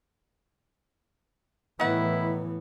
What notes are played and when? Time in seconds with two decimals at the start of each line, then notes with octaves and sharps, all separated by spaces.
1.80 A2 D#3 E3 B3 E4 F#5